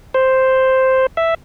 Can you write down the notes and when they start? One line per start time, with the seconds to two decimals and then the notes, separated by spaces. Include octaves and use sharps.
0.14 C5
1.17 E5